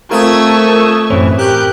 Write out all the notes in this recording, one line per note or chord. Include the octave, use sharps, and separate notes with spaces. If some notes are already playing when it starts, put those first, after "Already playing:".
A3 C4 F4 A#4 C#6 D#6 E6 G#6
F#2 A2 E3 C4 C#4
G4 A#4 F#6 G6